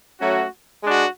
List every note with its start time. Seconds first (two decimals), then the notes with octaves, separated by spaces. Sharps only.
0.21 F#3 A3 C#4 F#4
0.84 G#3 D4 F#4